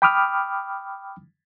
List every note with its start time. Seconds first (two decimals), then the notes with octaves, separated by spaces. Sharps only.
0.02 G5 B5 D6 D#6 F6